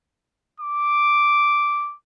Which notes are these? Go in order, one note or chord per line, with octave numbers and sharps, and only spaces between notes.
D6